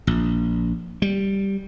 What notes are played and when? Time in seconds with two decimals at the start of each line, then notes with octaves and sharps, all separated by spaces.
0.07 A#1
1.02 G3